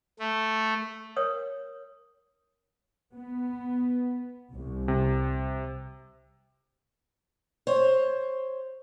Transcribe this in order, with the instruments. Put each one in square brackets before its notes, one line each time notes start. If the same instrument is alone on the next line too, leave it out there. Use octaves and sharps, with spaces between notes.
[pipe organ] A3
[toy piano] A#4 C#5 D#6
[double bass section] B3
C2
[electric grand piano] C3
[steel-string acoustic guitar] C5 C#5